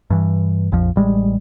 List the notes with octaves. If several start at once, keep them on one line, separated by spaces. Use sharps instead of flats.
G2 E3
A#1 F2 F3
A1 G3 G#3